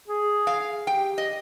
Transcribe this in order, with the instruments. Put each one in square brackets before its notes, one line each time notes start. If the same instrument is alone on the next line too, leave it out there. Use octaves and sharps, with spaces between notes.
[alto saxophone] G#4
[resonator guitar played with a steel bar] F5
[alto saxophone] G4 [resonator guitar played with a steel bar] G5
[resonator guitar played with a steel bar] D#5